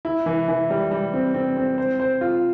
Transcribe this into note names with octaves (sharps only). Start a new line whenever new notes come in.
E4
E3
E3
G3
G3
C4
C4
C4
C5
C5
F4